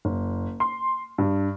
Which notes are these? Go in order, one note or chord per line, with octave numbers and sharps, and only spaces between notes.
F#1
C6
G2